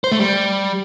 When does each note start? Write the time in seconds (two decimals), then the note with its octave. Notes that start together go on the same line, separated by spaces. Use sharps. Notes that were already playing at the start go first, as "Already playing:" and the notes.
0.04 C5
0.12 A3
0.19 G3